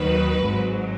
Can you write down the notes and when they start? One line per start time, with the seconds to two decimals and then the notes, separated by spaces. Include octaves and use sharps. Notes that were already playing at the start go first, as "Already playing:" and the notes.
Already playing: D#2 D#3 F#3 B4
0.39 G#1 G#2 F#3